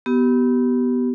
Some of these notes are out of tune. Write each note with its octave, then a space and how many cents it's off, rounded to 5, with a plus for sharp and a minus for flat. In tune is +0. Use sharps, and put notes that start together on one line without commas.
B3 +0 G4 -25